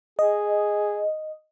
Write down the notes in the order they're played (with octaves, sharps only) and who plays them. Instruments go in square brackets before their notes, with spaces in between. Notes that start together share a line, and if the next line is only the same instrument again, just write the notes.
[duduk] G#4 [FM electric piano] D#5